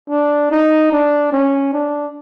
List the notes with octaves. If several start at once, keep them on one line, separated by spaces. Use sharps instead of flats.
D4
D#4
D4
C#4
D4